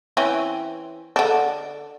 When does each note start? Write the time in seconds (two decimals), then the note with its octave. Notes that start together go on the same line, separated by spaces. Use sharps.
0.17 E3 C4 C#4
1.16 D3 D4